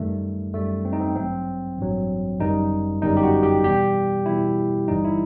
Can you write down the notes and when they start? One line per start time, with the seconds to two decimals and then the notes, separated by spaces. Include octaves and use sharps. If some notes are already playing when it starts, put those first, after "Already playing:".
Already playing: F#2 D#3 G3 A3
0.53 F#2 D#3 G3 A3
0.85 C4
0.93 D#4
1.00 C4
1.15 A1 G2 F#3 C4
1.77 A1 G2 F#3
2.39 G1 F#2 D#3 G3 D#4
3.02 G1 F#2 D#3 G3 D#4
3.17 G4
3.23 F#4
3.43 G4
3.64 E2 B2 G3 G4
4.26 E2 B2 G3 E4
4.88 G1 G2 E3 G3 D#4
5.04 E4